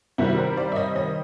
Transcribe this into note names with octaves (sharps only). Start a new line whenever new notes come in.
C3 D#3 G3 C4 E4 F#4
A#4 C5
C5 D5
E5
C#5 D#5
C#5 D#5